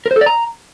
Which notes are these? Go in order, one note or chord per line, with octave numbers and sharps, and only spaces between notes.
A#4
C5
A4
D5
A#5